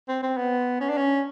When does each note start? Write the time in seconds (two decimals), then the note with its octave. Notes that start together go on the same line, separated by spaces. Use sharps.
0.08 C4
0.23 C4
0.37 B3
0.81 C#4
0.89 D4
0.97 C#4